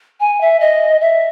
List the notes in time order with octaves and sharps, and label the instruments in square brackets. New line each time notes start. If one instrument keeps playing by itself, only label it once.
[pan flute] G#5
E5
D#5
E5